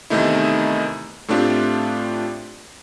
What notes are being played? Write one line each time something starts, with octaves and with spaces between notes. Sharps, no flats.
E2 C3 D#3 A3 D#4 E4
A2 A3 C4 D4 F4 G4